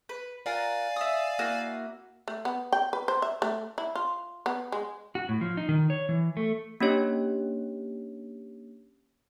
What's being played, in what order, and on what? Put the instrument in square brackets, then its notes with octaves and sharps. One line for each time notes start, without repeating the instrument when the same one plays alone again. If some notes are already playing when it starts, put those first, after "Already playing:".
[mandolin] B4
[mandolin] F4 A#4 F#5 [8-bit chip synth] D5 F5 G#5
[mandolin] E5 D#6
A#3 E4 F#4
[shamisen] A3
B3
G5
B4
C5
E5
A3
E4
F4
B3
G#3
[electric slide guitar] F#4
A2
F3
D#4
D#3
C#5
E3
A3
[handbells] A#3 C#4 D4 G4 C#5